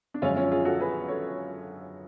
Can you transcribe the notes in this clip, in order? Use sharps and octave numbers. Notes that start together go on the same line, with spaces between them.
D4
F#2 D3 F3 G#3 C#4 F4
C#4 F4
F4 G#4
F#4 A4
G#4 B4
A4 C#5